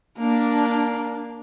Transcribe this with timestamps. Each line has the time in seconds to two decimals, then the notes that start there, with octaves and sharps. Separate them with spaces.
0.17 A#3 D4